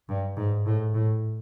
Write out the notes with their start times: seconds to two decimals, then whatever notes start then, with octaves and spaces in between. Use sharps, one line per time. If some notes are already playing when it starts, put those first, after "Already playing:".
0.09 G2
0.37 G#2
0.66 A2
0.94 A2